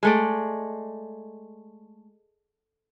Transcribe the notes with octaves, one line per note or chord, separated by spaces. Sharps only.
G#3 A3 D5